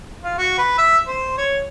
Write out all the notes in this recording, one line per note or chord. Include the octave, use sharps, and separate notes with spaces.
F4
F#4
B4
E5
C5
C#5